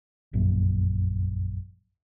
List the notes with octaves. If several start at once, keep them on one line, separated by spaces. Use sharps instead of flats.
F1 A#1 F#2